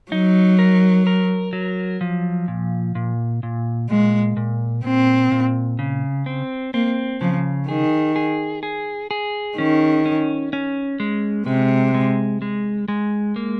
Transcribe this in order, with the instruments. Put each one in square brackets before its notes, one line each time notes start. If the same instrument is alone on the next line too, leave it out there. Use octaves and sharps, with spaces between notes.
[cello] F#3 [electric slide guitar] D#4
[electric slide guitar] A#4
A#4
F#3
F3
A#2
A#2
A#2
[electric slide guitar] A#2 [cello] G#3
[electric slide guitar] A#2
[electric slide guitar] A#2 [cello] C4
[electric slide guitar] A#2
C#3
C4
[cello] A#3 [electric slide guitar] C4
[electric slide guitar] C#3 [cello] F3
[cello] D#3 [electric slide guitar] G#4
[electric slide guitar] G#4
G#4
G#4
[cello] D#3 [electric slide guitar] C#4
[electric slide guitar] C#4
C#4
G#3
[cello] C3 [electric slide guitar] G#3
[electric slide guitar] G#3
G#3
G#3
A#3